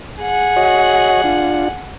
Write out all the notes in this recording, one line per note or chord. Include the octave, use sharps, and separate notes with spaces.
G#4 F#5
F#4 C#5 D#5
D4 F4